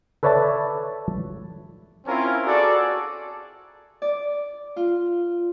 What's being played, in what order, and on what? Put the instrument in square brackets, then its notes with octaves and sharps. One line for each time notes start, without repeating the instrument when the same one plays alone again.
[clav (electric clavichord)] A4 B4 C#5 D5 E5 A5
[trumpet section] C4 C#4 E4 F4 A#4
F#4 G#4 A4 D5
[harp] D5
F4